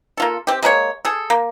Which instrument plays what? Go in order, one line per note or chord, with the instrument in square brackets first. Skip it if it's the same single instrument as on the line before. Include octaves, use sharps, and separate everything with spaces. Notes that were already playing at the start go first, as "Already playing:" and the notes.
[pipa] A#3 F4 A4
C4 G4
G#3 A#3 B4 C#5
G#4 A4
A#3